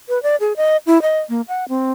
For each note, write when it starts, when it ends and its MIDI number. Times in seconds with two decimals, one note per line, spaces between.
0.09 0.21 71
0.23 0.36 74
0.40 0.53 68
0.57 0.77 75
0.87 1.01 64
1.02 1.19 75
1.29 1.41 58
1.48 1.64 78
1.69 1.92 60